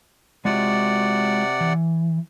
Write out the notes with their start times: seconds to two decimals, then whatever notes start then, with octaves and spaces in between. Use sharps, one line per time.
0.45 C3 G#3 F4 F#4 D5 F#5
1.61 E3